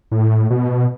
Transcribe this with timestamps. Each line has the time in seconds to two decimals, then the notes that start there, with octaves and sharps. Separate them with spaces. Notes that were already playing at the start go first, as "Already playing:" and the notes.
0.12 A2
0.50 B2